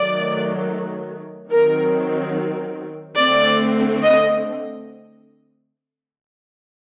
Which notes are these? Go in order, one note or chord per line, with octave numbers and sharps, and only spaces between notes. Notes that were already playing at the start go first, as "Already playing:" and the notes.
Already playing: D#3 F#3 A3 D5
D#3 F#3 C4 A#4
D3 A3 C4 D5
D#5